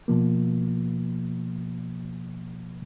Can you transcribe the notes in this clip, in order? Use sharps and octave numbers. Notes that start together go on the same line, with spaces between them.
B2 F3 A#3